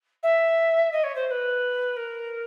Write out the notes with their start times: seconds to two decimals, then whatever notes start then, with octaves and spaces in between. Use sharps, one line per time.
0.23 E5
0.92 D#5
1.04 C#5
1.15 C5
1.27 C5
1.31 B4
1.96 A#4